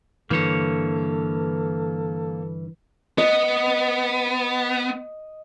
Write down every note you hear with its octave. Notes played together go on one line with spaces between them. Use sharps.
G2 D3 E3 A#3 A4 C#5
B3 D#5